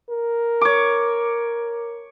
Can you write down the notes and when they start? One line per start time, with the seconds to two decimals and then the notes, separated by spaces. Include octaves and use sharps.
0.10 A#4
0.61 C#5 D6